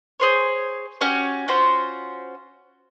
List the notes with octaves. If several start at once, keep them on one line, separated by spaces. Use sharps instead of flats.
G#4 C5 C#5
C#4 F#4 G4 C#5
C#4 F4 F#4 C5